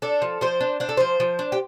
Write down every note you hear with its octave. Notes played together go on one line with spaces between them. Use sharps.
D4 A4
F3
F3 C5
D4
D4 C5
A4
F3 C5
F3
D4
G4